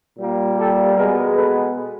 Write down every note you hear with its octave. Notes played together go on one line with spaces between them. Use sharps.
A#2 G3 A#3
G4 A4
B2 G#3 B3 G#4 A#4
A4 B4